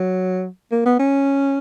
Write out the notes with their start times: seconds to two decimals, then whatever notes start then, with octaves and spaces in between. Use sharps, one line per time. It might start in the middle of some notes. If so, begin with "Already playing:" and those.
Already playing: F#3
0.72 A#3
0.86 B3
0.99 C#4